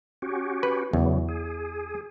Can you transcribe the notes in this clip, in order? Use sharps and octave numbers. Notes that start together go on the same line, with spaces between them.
C#4 F#4 G4
B4
E2 C#3 E3 F#3
G#4